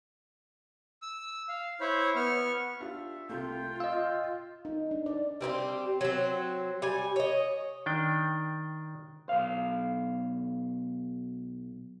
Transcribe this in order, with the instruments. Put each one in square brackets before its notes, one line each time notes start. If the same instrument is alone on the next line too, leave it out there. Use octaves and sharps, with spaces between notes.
[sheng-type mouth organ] E6
F5
E4 C5 C#5 B5
B3 C#6 F6
[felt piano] D4 F4 G4 [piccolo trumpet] E5
[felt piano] C2 A3 [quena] F4 [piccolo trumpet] G5
[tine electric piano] D#5 F5 [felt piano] E6
[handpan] D#4
D4
D5
[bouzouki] G3 C4 D#4 G4
F#3 C4
G3 G#5
C#5 D#5
[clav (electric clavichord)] D#3 D4 G5
[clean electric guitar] B1 F5